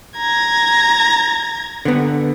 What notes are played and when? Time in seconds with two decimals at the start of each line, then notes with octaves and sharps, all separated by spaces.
0.18 A#5 G#6
1.85 D3 B3